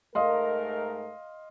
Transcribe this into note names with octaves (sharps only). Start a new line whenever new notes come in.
G#2 A3 A#4 D#5 F5 C6